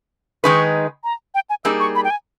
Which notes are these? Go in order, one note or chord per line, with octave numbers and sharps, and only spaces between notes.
D#3 G#3 D#4 G#4 B4 C#6
A#5
G5
G#5
G3 A#3 D#4 G#4 E6
C#6
B5
G5
G#5